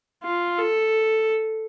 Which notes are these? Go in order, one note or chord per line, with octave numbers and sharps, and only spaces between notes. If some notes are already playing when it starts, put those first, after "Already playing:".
F4
A4